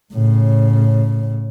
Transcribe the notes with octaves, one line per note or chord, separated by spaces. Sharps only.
A2 C#3